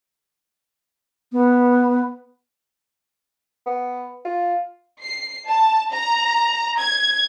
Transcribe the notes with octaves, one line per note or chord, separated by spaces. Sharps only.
B3
B3
F4
C7
A5
A#5
G#6